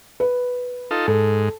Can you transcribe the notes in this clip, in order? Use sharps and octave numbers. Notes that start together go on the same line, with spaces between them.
B4
D#4 F4 A4
G#2 A4